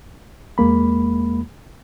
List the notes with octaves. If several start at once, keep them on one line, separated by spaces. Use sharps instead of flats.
E2 G#3 A#3 B5